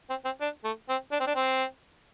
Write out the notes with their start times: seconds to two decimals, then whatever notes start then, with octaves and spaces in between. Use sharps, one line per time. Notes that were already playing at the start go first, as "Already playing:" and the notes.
0.10 C4
0.25 C4
0.41 D4
0.64 A3
0.89 C4
1.12 D4
1.20 C4
1.27 D4
1.35 C4